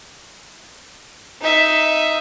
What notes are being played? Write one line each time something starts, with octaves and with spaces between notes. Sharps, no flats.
D#4 E5